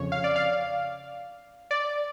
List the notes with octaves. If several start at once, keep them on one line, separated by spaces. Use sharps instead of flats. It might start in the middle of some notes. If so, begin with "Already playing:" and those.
Already playing: F2 C#3 C#5
F5
D5
F5
D5